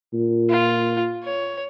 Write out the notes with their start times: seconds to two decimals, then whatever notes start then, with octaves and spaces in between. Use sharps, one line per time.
0.13 A#2
0.50 F4
1.24 C#5